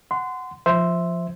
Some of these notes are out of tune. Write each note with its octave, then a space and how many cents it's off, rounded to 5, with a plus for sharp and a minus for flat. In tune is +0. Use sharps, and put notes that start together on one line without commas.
F#5 +0 C6 -25
F3 +0 C5 +0 E5 +0